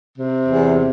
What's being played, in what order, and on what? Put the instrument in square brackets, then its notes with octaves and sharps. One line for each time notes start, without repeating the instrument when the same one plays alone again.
[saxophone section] C3
E2